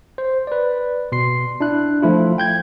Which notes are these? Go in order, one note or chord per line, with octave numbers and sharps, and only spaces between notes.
C5
B4 D5
B2 C6 C7
D4 E4 F#6
F3 A3 E4 F4
G5 G6 G#6